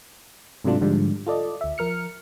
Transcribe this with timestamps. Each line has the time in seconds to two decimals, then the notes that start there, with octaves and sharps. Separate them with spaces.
0.64 G#2 C3 F#3 A3 D4 F4
0.81 G#2 D3 F3 G3 G#3
1.27 F4 A4 D5 D#5
1.61 D2 E5
1.78 F3 A#4 F6 C#7